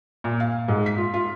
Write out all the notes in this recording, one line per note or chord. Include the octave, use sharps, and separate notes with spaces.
A#2
F5
G#2
B6
F4
F4